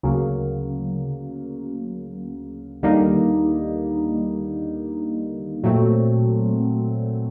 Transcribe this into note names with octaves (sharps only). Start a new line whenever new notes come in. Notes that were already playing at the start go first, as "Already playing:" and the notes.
D2 C#3 F#3 A#3
D#2 D3 G3 A#3 D#4
A#2 F#3 A3 C4